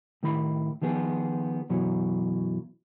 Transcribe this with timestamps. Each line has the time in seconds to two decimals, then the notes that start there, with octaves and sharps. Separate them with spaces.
0.23 A2 D#3 E4 B5
0.82 D#3 F3 B3 G#4
1.70 F#2 B2 E3 F#3